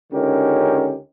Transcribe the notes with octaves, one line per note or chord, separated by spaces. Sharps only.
C#2 D3 C#4 D#4 G4 A#4